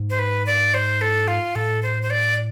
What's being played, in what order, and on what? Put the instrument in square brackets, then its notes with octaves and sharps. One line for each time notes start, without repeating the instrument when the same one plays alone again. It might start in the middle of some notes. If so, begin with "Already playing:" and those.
Already playing: [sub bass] G#2
[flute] C5
B4
D5
C5
A4
F4
[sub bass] A2 [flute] A4
[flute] C5
C5
D5